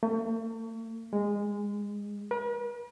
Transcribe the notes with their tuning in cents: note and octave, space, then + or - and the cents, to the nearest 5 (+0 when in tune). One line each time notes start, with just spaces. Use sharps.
A3 +45
G#3 -20
B4 -45